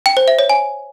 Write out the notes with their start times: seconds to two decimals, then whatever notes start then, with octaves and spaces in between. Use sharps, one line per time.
0.06 G5
0.17 C5
0.28 E5
0.39 C#5
0.49 G#5